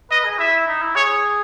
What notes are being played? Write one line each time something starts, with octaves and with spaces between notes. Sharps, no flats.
B4 D#5
G#4
E4 E5
D#4
E4
G#4 C#5